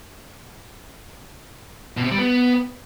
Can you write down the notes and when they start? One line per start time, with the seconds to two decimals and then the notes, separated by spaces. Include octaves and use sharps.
1.97 B2
2.04 C3
2.11 G3
2.18 B3